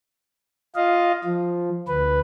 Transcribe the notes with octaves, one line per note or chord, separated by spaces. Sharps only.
F4 D#5 F5
F3
D2 B4